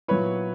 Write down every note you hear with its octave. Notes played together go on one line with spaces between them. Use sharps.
A#2 F#3 B3 E4 B4 C#5